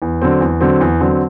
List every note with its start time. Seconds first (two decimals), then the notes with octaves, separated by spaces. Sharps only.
0.02 E2
0.22 D3 F#3 C4
0.41 E2
0.61 D3 F#3 C4
0.81 E2
1.00 D3 F#3 C4